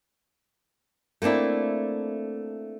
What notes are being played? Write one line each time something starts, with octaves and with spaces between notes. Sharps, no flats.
A3 A#3 C4 D4 E4